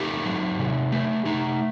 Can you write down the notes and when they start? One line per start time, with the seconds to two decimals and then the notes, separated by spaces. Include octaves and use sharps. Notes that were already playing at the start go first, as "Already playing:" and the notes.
Already playing: A3 D#4 G4
0.25 F#3
0.59 C3
0.92 A3
1.25 A3 D#4